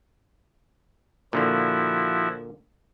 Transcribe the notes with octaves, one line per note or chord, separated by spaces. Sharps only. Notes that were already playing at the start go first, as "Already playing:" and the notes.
A#2 D3 F3 A#3 E4 F#4